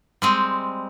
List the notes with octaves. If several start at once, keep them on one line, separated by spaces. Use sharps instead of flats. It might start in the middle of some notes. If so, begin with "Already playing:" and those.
G3 G#3 C4